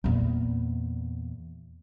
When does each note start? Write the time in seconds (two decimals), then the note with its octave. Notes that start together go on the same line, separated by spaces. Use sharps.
0.04 E2 A#2